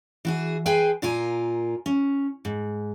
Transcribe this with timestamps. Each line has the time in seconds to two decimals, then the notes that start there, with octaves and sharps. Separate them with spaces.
0.25 E3 F#4 G#4
0.66 G#4 B4 C5 G5 G#5
1.02 A#2 F4 A#4 G#5
1.86 C#4
2.45 G#2